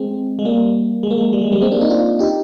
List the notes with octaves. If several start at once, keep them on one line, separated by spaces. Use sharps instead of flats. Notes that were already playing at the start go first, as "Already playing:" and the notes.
Already playing: G#3 C4
G#3
G3 A#3
G#3
A#3
G#3
G3
G#3
G3 A#3
G#3 C4
A#3 D4
C4 D#4
D4 F4
D#4 G4